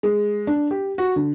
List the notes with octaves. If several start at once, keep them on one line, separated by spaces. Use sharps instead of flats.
G#3
D4
G4
F#4
D3